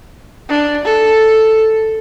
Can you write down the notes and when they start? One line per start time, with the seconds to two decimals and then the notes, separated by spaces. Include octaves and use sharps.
0.49 D4
0.85 A4